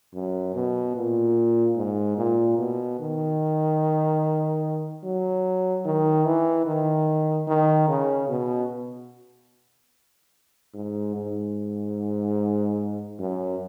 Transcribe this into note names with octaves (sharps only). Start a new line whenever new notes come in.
F#2
B2
A#2
G#2
A#2
B2
D#3
F#3
D#3
E3
D#3
D#3
C#3
B2
G#2
G#2
F#2